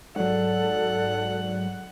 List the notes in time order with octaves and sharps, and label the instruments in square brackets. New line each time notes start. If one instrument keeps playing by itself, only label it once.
[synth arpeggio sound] G#2 F#3 [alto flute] A4 [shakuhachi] D5 [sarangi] F#5